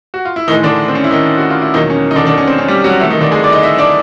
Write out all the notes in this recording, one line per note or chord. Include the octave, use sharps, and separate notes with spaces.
F#4
F4
E4
A2 D#3 E3 G#3 D#4
D3 D4
C4
C#4
E4
D#3 D#4
F#4
F4
E4
E2 B2 D#3 F#3 A#3 D#4
C#4
D#4
D3 D4
D3 D4
C#4
C4
C#4
G3 G4
F#3 F#4
C3 E3 A3 E4
D#3 D#4
D3 D4
G#3 G#4
D5
D#4 D#5
E4 E5
D4 D5